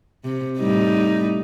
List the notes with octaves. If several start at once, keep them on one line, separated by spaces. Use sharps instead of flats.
C3
A2 G3 D#4